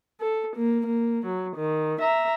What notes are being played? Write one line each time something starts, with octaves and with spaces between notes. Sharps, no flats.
A4
A#3
A#3
F#3
D#3
E5 A#5